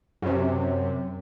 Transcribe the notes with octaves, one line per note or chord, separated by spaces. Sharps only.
F#2 C3